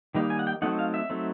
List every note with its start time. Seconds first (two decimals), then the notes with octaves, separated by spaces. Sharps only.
0.14 D#3 G3 A#3 D#4
0.30 G#5
0.39 F#5
0.47 G5
0.62 F#3 A3 C4 D#4 F#5
0.79 F5
0.94 E5
1.10 F#3 A3 C4 D#4